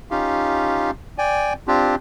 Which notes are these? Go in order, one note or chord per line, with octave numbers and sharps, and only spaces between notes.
C#4 D#4 F4 G4 F5
D5 G5 G#5
C4 D4 F4 G4